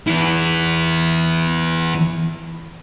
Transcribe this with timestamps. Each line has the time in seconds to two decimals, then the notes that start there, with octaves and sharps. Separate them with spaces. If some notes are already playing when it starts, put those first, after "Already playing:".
0.07 E2 E4